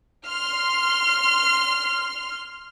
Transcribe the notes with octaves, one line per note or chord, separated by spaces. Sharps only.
C6 F6